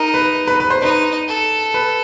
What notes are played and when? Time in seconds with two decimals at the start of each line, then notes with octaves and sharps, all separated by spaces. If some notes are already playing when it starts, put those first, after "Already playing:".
Already playing: D#4 A#4
0.14 B4
0.47 B4
0.60 B4
0.70 C5
0.82 D#4 B4
1.28 A4
1.74 B4